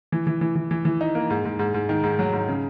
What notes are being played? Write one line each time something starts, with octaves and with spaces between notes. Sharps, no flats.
E3
E3
E3
E3
E3
E3
D#4
A#3
G#2
G#2
G#2
G#2
D#3
G#2
F#3
G#2
C#3